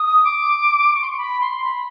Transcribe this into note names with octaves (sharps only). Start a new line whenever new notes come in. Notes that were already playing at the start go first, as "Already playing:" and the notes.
Already playing: D#6
D6
C#6
C6
C#6
B5
C6
B5